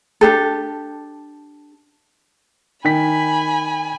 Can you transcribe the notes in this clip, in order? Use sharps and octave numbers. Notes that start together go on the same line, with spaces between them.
D4 G4 A4
D#3 G5 G#5 B5 B6